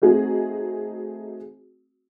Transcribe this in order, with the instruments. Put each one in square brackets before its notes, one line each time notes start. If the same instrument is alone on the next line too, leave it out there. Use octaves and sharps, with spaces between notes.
[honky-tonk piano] A3 C4 D#4 F#4 G#4